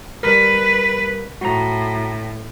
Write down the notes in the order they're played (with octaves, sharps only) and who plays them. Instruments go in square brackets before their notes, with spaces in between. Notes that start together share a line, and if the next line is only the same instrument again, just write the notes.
[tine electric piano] G3 A#4 [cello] B4
[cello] A2 [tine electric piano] F#4 A#5